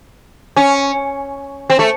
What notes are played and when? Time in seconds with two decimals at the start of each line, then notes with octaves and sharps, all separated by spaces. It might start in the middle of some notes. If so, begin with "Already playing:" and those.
0.56 C#4
1.70 C4
1.79 A3